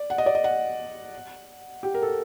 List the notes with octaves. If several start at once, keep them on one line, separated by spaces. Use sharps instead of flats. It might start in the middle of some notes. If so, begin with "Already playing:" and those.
Already playing: D5
F#5
D#5
D5
D#5
F#5
G4
A#4
A4